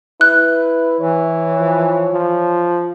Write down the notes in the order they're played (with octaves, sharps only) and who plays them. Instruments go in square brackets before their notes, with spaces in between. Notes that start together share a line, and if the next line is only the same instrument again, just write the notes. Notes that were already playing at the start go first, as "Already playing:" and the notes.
[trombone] E4 [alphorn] B4 [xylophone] F#6
[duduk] E3 [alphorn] C#5
[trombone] F3
F3